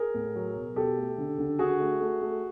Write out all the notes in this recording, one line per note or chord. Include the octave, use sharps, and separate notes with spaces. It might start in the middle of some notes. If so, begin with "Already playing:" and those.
Already playing: G#4 A#4
A2
F#3
B2
B2 G4 A4
A3
D3
D3
D3 F#4 G#4
A3
A3
A3